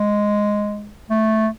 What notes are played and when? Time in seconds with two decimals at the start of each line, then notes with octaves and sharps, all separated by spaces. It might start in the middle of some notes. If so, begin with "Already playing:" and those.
Already playing: G#3
1.10 A3